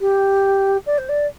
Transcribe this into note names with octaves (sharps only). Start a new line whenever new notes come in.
G4
D5
C5
D5